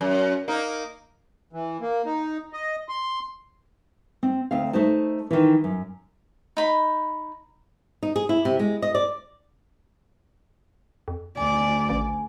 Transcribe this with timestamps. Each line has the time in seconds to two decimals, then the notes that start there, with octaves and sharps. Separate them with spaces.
0.01 F#2
0.48 A#3 D#4
1.53 E3
1.81 A#3
2.06 D#4
2.53 D#5
2.89 C6
4.23 C4
4.51 D2 C4 F5
4.73 A3 D#4 C5 A5
5.31 D#3 E3
5.64 F#2
6.57 D#4 B5
8.03 D#4
8.16 G#4
8.29 E4
8.45 C3
8.59 G#3
8.82 D#5
8.95 D5
11.08 F2
11.37 D2 D5 G#5
11.90 A1